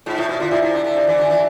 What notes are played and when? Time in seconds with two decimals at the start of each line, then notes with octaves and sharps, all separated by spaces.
0.06 G#2 F4
0.18 A2 E4
0.29 B2 E4
0.40 D3 F4
0.51 C3 E4
0.62 C3
0.74 D3
0.84 D3
0.96 C3
1.07 E3
1.18 D3
1.30 E3